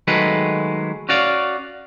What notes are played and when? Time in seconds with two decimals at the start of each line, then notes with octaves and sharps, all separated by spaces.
0.07 D#3 F#3 G#3 A3 B4
1.09 C#4 F#4 D5 F5